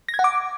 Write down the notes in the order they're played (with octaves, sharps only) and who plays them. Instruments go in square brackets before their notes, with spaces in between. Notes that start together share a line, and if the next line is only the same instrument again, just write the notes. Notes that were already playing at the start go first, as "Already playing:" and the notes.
[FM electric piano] A#6
G#6
F#5
D6